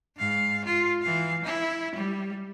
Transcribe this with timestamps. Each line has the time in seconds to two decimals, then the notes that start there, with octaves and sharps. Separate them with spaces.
0.17 G#2 F5
0.65 F4
1.01 E3 F5
1.44 E4
1.95 G3